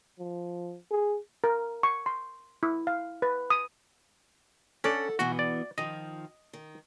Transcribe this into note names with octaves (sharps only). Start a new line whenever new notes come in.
F3
G#4
A#4
C#6
C6
E4
F5
B4
D#6
C#4 D4 A4 D5 F#5
B2 E3 B3 F#4
D5
D#3 F3 D#5
D#3